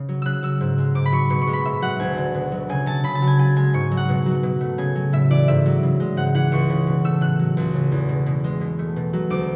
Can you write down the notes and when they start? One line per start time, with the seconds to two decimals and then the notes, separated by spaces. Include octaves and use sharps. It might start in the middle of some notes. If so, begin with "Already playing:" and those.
Already playing: C#3
0.09 F#3
0.22 C#3 E6 F#6
0.43 F#3 E6
0.61 G#2
0.78 G#3
0.95 G#2 D6
1.06 B5
1.12 F#3 C#6
1.30 B2 C#6
1.42 C#6
1.47 G#3
1.53 B5
1.65 A2 E5
1.82 F#3 F#5
2.00 D2 G#5
2.17 D3
2.34 B2
2.52 F#3
2.69 C#3 G#5
2.86 F#3 A5
3.04 C#3 B5
3.15 A5
3.22 F#3
3.27 G#5
3.39 C#3 G#5
3.56 G#3 G#5
3.74 G#2 C#6
3.91 F#3
3.97 F#5
4.09 B2
4.26 F#3
4.43 B2
4.61 A3
4.78 C#3 G#5
4.95 F#3
5.13 A2 E5
5.30 E3 D5
5.48 G#2 E5
5.66 F#3
5.83 C#3
6.00 G#3
6.17 G#2 F#5
6.35 E3 F#5
6.52 C#2 C#6
6.70 C#3
6.87 B2
7.05 A3 E6
7.21 A2 F#6
7.39 F#3
7.57 C#2
7.74 C#3
7.92 E2
8.09 B2
8.26 B2
8.44 G#3
8.61 B2
8.79 A3
8.96 B2
9.13 F#3
9.30 D2 D6